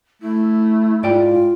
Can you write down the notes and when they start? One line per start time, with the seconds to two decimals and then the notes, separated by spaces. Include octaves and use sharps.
0.22 A3 E4
1.03 G#2 F4 D5 G5